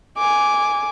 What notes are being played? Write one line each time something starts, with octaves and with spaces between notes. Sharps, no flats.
G#5 D6